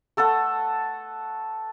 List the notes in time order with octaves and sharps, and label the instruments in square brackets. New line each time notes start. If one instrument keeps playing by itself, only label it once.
[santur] A3 A4 B4 F#5